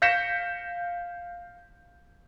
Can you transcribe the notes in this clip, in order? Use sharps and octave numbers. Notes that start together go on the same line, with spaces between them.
F5 G6 A#6 B6 C#7 E7